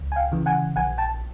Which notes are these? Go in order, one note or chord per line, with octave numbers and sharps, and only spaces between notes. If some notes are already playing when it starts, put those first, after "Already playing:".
Already playing: C#2
G#5
F5 G5
C#3 E3
F#5 G#5
A#1 F#5 G#5
G5 A5